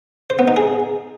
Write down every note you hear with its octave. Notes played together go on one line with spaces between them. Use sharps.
C5
B3
D#4
G#4